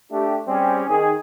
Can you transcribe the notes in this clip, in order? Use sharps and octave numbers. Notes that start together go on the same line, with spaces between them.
A3 D4 G4
G3 C4 C#4 G4 G#4
D#3 G#4